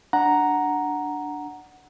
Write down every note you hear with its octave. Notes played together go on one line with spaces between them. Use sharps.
D4 F#5 A#5